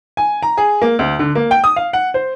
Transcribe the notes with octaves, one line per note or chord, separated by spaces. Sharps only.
G#5
A#5
G#4
A#3
D2
D3
A#3
G5
D#6
F5
F#5
C5